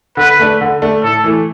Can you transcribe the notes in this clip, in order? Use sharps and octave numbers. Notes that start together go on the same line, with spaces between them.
D3 B4
A3 D4
D3
A3 D4
A2 A4
E3 A3